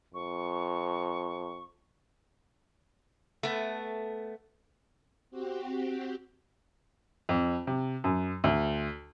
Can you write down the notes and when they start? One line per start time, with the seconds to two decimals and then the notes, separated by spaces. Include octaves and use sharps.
0.14 F2 C#6
3.43 A3 B3
5.31 C4 F#4 G4
7.29 F2
7.67 C3
8.04 F#2
8.44 D2